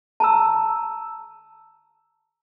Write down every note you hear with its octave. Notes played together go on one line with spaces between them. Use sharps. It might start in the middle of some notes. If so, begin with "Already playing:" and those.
A5 A#5 E6